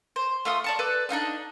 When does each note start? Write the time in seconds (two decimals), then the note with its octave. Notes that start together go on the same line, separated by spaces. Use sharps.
0.16 C5
0.45 A3 F4 C6 D#6
0.64 D5 A5 C#6
0.79 A4 B4 D5
1.09 D4 D#4 F4 D#5